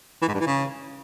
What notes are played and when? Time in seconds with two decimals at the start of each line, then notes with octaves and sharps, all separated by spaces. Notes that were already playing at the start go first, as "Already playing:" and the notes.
0.22 E3
0.28 G#2
0.34 G2
0.41 E3
0.47 C#3